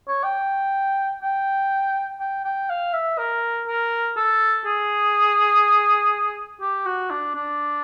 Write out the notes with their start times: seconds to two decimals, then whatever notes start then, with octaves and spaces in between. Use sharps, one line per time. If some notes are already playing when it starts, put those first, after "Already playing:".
0.08 C#5
0.24 G5
1.22 G5
2.20 G5
2.45 G5
2.70 F5
2.93 E5
3.18 A#4
3.67 A#4
4.17 A4
4.66 G#4
6.61 G4
6.86 F#4
7.11 D4
7.35 D4